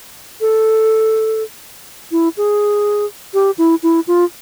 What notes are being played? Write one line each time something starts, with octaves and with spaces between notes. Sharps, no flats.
A4
E4
G#4
G4
E4
E4
F4